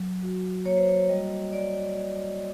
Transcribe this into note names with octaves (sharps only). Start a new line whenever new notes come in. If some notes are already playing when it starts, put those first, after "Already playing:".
Already playing: F#3
F#4
A#3 C#5
C5
C#5
G3 D#5
G3 D5